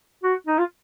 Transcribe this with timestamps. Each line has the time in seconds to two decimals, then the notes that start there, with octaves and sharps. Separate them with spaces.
0.24 F#4
0.47 D#4
0.58 F4